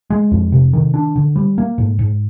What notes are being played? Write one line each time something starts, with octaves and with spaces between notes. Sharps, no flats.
G#3
F2
C3
D#3
D4
D3
G3
A#3
G#2
G#2